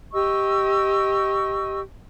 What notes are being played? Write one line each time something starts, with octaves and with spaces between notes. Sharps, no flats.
G4 D#5 C#6 E6